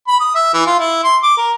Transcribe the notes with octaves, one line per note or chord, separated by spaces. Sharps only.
B5
D#6
E5
E3
F4
E4
C6
D6
A#4